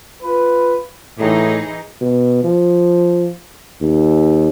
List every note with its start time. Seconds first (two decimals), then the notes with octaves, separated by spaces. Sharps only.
0.23 F4 B4
1.19 A2 E3 D#4 G#4
2.01 B2
2.44 F3
3.81 D#2